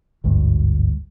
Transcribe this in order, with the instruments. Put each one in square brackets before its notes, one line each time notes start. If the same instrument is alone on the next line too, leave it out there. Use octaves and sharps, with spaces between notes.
[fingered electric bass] G#1 D2 G2